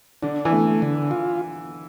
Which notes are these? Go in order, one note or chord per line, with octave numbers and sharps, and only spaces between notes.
D3 D4
E3
A3
D3
F4